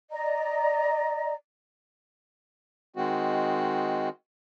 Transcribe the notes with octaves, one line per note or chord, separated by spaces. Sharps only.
D5 D#5 A#5
D#3 G#3 C4 F#4